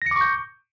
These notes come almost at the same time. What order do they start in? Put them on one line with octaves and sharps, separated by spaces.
A#6 C#7 D6 C#6 G6